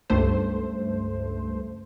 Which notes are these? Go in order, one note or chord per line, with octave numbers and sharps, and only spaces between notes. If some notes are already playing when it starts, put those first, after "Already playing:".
C#2 G2 A3 C5